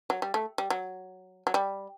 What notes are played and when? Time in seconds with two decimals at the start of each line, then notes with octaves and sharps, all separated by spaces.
0.10 F#3
0.22 G3
0.34 A3
0.58 G3
0.70 F#3
1.47 F#3
1.54 G3